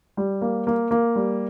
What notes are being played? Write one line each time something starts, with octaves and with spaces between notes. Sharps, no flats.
G3
A#3
A#3
A#3
G3